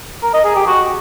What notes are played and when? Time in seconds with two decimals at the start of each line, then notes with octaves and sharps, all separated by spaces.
0.23 A#4
0.34 D#5
0.45 G#4
0.56 G4
0.66 F#4